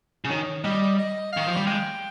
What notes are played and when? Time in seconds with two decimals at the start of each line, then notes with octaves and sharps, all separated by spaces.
0.25 C#3
0.30 D#3 C#5
0.64 G3 D#5
0.99 D#5
1.33 D#3 F5
1.47 F3
1.57 G3
1.67 G#3 G5